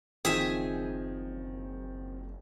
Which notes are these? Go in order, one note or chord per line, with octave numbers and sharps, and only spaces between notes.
F#1 D#3 F3 C4 G#4 E5 G#5